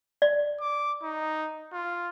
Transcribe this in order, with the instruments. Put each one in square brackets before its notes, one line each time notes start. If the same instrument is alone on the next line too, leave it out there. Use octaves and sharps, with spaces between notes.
[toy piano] D5
[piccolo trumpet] D6
D#4
F4